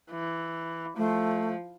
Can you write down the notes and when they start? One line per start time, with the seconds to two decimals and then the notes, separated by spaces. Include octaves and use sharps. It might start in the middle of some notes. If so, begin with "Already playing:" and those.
0.11 E3
0.97 F3 A3